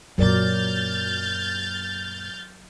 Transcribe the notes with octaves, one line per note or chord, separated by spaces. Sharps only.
F#2 A#2 F#3 A#4 D5 F6 G6 A6